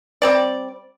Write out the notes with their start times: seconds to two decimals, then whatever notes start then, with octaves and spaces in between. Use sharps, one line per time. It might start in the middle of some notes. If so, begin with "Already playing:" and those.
0.22 G3 C4 D5